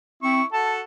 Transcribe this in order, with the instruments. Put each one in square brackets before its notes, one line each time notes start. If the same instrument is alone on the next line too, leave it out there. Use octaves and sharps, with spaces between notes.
[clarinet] C4 [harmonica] E4 C#6
[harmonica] F#4 A4 [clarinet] A5